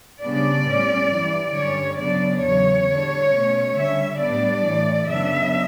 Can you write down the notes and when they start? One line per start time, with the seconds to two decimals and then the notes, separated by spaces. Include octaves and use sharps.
0.21 C#3 G3 B3 D4 D5
0.65 A2 G3 C#4
1.10 G2 E3 G3
1.54 G2 D3 G3 C#4 C#5
1.99 C#3 F#3 B3 D4 D5
2.42 E2 C#3 F#3 C#5
2.88 D3 G3 D4
3.31 B2 A3 C#4
3.75 D3 G3 C#4 E5
4.20 A2 G3 B3 D4 D5
4.64 A2 E3 A3
5.08 F#2 C#3 F#3 B3 D4 E5